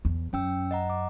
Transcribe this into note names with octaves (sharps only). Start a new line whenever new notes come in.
E2
F#2 C#4 G5 E6
D#5 F#5 A#5
D6